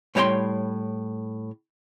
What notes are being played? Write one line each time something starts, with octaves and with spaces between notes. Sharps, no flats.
A2 G3 C#5 D5 G5 C6